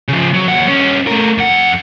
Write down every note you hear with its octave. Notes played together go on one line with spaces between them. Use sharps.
C#3 F3
F#3
D#2 F#5
G2 C#4
A3 A#4
F2 F#5